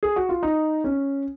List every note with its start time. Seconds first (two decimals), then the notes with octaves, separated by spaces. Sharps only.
0.03 G#4
0.16 F#4
0.29 F4
0.43 D#4
0.84 C#4